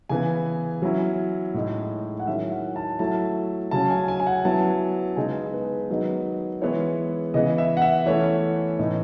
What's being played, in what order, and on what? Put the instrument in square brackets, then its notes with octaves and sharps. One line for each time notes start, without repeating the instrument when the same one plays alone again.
[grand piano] C#3 E3 B3 G#5
F#3 C#4 E4
A2 G#3 D#4
F#5
D#3 F#3 C#4 E4 E5
F#5
A5
F#3 A3 E4 A5
C#3 F#3 C#4 A5
G#5
G#5
G#5
F#5
F#3 B3 E4 A5
C#3 G#3 B3 D#4 G#5
B4
D#3 F#3 B3 D#4
E3 G#3 B3 E4 C#5
C#3 E3 B3 D#5
E5
F#5
E5
E3 A3 C#4 E4 C#5
A2 E3 B3 D#4 D#5